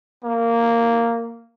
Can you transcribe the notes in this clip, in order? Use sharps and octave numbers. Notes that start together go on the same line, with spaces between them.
A#3